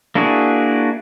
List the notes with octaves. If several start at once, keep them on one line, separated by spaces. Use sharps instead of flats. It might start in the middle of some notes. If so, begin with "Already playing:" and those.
A#3 D4 E4 F#4 G#4